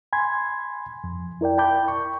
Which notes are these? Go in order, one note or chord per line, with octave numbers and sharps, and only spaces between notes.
G#5 B5 C6 G#6
F2
E4 A#4 D5 G5
G5 A5 B5 D6 G6
C#6